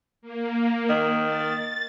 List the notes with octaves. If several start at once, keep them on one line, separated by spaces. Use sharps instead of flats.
A#3
D#3
A6